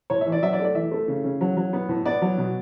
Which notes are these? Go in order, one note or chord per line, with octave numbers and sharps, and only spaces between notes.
A2 C#5
E5
E3
D5
F#3 E5
D5
A3
D5
E3 E5
A3
C#3
C#3
F#3
F#3
B3
A2
B3 D5
F#3
B2